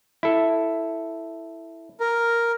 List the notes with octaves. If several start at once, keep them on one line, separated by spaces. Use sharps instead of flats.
E4 A4
A#4